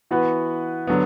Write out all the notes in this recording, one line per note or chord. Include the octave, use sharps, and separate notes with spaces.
E3 B3 F#4 B4
D3 F#3 B3